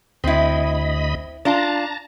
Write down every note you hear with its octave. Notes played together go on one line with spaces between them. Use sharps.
D2 C4 E4 D#5 B5
D4 F4 A5 A#5